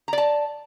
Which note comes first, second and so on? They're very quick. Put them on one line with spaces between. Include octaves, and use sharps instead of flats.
A#5 D5 A5